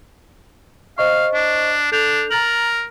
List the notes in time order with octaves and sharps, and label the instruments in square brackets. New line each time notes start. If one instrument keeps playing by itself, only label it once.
[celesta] C5 D#5 C#6 [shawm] F5
[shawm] D4
[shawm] D4 [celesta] A4 G6 F7
[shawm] A#4 [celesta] A#5 A6 F#7